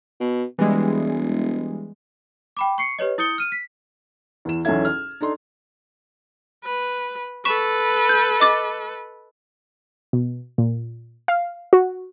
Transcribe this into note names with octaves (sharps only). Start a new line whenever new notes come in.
B2
E1 E3 G3 G#3
G5 B5 D6
C#6 C7 C#7
G4 B4 C#5 D#5
E4 D#6 G6 C#7 G7
F6 D#7
B6
E2 E3 E7
B1 E2 C#4 A4 E5 G#6
F6
D4 D#4 A4 C6
B4
A4 B4 C#6 B6 E7
G6
D#5 D6 A6
B2
A#2
F5
F#4